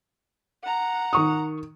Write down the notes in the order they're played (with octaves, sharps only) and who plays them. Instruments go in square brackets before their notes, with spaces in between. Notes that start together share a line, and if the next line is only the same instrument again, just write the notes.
[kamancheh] F#5 A#5
[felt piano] D#3 C#6 D#6